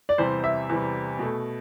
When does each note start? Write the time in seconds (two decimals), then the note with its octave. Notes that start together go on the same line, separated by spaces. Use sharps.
0.09 D5
0.18 E2 C3 E3 G3 C5
0.44 E5
0.69 E2 C3 E3 G3
1.19 B2 A3